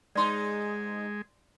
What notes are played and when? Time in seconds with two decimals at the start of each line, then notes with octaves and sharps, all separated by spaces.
0.15 G#2 G#3 D#4 D5 C6